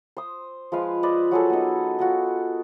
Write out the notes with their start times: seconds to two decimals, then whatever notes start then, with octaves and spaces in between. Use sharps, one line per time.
0.17 C5 D#6
0.72 F3 G#3 B4 F5
1.03 B4 C5 D5 D#5
1.31 F#3 G#4 A4
1.50 B3 D#4
1.99 D#4 F4 F#4